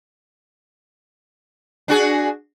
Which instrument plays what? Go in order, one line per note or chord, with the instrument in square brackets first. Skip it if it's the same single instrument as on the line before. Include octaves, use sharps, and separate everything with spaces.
[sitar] D4 F#4 G#4